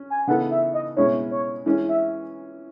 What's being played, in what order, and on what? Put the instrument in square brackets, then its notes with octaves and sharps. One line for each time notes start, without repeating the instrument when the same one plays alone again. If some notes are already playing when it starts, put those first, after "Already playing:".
Already playing: [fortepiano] C#4
[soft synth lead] G#5
[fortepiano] C#3 E3 B3 D#4 A4 [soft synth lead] F#5
[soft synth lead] E5
D#5
[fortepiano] B2 G#3 C#4 E4 [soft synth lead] C#5
[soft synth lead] C#5
[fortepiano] E3 G#3 C#4
[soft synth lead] E5